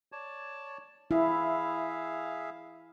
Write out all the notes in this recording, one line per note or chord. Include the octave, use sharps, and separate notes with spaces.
C#5 D5 A5
E4 G#4 E5 F5